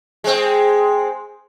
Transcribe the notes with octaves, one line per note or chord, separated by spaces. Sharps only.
G#3 C4